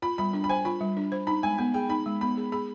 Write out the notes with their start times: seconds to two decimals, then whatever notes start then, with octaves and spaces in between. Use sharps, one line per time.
0.02 F4 B5
0.18 G3 B5
0.33 D4
0.44 B5
0.49 C5 G#5
0.65 F4 B5
0.81 G3
0.97 D4
1.12 C5
1.27 D#4 B5
1.43 G#3 G#5
1.58 B3 G#5
1.74 G#4 G5
1.89 D#4 B5
2.06 G#3
2.21 B3 B5
2.37 G#4
2.52 G#4 B5